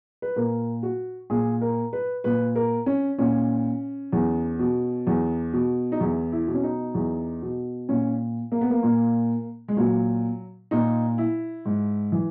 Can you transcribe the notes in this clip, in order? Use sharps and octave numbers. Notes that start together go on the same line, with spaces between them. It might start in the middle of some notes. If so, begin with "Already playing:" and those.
B4
A#2 A#4
F#4
A#2 G#4
A#4
B4
A#2 B4
A#4
C#4
A#2 C#4
E2
B2
E2
B2
D#4
E2 E4
E4
B2
C#4
D#4
E2
B2
A#2 C#4
A#3
B3
A#3
A#2
G#3
A#2 F#3
A#2 D#4
E4
G#2
E3